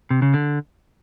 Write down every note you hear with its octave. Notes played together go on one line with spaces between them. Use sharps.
C3
C#3
D3